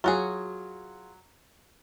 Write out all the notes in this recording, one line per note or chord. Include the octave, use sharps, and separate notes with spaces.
F#3 F4 F#4 G#4